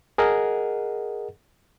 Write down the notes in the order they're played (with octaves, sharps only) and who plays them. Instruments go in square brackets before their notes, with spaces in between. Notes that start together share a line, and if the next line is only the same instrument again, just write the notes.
[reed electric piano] G#4 A#4 D#5 F#5